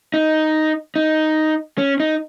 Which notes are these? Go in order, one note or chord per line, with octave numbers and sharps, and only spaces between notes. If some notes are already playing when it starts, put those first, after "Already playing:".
D#4
D#4
C#4
D#4